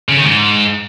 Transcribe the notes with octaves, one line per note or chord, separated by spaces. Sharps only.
C#3
D#3
G#2